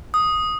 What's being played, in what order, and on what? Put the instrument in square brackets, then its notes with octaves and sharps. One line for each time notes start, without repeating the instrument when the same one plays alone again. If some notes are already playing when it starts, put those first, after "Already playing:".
[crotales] D#6